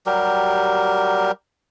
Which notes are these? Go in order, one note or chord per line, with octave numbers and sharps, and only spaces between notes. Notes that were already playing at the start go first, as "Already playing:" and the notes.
F#3 G3 G4 A#4